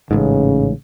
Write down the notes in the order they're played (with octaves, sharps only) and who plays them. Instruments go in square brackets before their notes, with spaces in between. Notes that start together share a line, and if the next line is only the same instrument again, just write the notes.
[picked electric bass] A1 G#2 [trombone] C#3